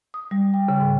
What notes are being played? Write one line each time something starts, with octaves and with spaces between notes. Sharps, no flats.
D#6
G3
G5
C#3
G#2